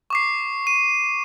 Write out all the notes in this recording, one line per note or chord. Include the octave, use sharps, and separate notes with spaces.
C#6 D6 C7
D#7